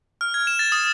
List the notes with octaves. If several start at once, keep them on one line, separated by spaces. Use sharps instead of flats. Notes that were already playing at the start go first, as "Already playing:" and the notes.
F6
G#6
E7
A6
D#6